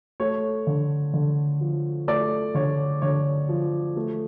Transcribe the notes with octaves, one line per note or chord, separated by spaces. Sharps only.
A3 C#5
D3
D3
F3
A3 D5
D3 C#5
D3 C#5
F3
A3